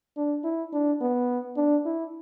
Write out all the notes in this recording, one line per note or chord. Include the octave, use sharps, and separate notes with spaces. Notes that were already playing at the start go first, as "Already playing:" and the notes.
D4
E4
D4
B3
D4
E4